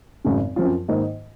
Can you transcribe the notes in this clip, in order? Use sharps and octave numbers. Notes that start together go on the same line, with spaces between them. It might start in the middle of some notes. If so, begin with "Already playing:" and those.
G#1 F#2 C#3
F#2 F3 C4 F4
G#2 D#3 A#3 D#4